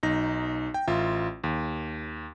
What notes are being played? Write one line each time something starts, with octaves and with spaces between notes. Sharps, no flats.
B1 D#4 A#6
G5
A1 F4 E5
D#2